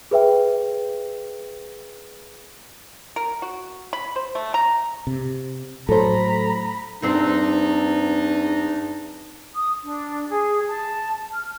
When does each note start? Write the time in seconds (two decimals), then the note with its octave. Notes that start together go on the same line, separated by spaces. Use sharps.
0.11 G#4 B4 E5 G5
3.16 A#4
3.42 F#4
3.93 B5
4.16 C5
4.35 A3
4.54 A#5
5.07 C3
5.89 A2 F#3 A4 C5 A#5 B5
7.02 E2 G2 C4 D4 D#4 C5
9.55 D#6
9.83 D4
10.28 G#4
10.68 A5
11.33 F6